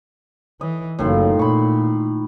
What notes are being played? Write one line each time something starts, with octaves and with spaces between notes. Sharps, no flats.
E3 D#5
F#1 A2 D#3 F4
A#2 B5 C#6